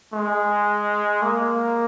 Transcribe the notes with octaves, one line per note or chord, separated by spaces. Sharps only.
G#3
A#3